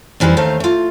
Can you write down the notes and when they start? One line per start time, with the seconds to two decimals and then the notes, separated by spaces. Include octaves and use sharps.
0.20 F2 D#3 E3 G3 C5
0.37 D#2 D#3 A3 C5 F5 A#5
0.60 A3 F4